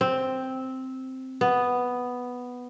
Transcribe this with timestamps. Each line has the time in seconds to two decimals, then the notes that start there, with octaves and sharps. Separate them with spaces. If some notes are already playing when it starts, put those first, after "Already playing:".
0.01 C4
1.41 B3